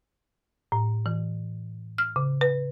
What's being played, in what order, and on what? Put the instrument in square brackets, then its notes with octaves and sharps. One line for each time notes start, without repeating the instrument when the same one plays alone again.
[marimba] A2
E3
F6
C#3
B4